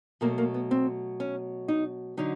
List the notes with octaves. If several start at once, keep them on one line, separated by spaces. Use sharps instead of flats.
B2 F#3 A3 A#3
A#3
B3
C4
C#4
D#4
D3 F#3 D#4